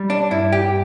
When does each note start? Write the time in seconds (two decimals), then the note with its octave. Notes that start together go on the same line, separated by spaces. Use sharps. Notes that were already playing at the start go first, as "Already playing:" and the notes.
Already playing: G3
0.10 D4
0.31 G2 E4
0.52 G4